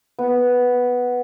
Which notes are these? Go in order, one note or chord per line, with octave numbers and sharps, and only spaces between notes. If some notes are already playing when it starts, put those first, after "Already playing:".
B3